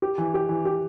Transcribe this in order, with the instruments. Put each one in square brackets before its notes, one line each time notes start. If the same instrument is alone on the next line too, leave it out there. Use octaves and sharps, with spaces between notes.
[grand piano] G4
E3
G4
E3
G4